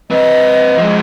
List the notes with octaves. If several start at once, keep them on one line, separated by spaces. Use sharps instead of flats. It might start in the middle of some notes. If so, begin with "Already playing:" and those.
C4 B4 D#5
F3 G#3